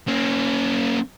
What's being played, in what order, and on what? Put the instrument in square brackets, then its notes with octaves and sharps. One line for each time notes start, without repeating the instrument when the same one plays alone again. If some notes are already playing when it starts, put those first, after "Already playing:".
[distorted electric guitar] A#3 C#4